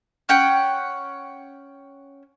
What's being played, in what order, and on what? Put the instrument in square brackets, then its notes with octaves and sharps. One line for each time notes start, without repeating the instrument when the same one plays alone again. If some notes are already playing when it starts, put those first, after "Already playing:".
[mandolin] C#4 F#5 G5